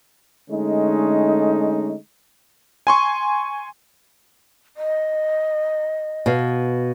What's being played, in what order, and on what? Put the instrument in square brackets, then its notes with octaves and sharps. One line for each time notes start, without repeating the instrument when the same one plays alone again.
[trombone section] D3 G#3 A3 C#4 D#4
[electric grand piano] G#5 C6 C#6
[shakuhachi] D#5
[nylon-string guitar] B2 F5